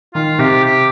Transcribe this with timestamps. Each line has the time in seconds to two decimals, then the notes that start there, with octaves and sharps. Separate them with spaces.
0.15 D#3 F4
0.39 C3 G4
0.64 G4